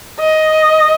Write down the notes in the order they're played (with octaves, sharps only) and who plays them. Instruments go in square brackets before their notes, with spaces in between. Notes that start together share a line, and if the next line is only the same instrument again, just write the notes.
[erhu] D#5